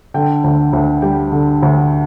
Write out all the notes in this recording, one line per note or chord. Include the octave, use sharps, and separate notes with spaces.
D3 G5
D2
D2
G3 G5
D3
D2